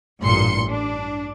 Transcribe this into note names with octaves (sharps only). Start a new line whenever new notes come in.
A1 G2 A#2 C6 C#7
D4